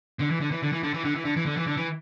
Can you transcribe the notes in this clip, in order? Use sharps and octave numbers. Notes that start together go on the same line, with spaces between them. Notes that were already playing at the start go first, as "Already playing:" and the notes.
D3
E3
D3
E3
D3
E3
D3
E3
D3
E3
D3
E3
D3
E3
D3
E3